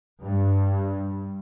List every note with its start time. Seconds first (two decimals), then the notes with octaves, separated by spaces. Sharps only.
0.23 G2